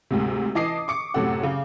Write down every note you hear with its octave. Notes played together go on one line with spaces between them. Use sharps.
D2 G#2 C3
E3 D#5 A5 D6 D#6 C7
C#6 D6 C#7
F#2 A2 C3 A4 F#5
C#3